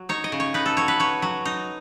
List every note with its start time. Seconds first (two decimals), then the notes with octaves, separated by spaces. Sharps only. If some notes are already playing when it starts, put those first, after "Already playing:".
Already playing: F#3
0.09 D#4 C#5
0.24 D#5
0.32 C#3
0.40 C#5
0.54 D#4 B4
0.66 A4
0.77 F#3 C#5
0.88 B4
1.00 F#3 C#5
1.22 F#3
1.45 D#4